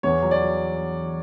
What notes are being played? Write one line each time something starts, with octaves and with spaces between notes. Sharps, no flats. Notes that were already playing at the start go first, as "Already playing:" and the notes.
E2 C#5
F#3
D5
F#3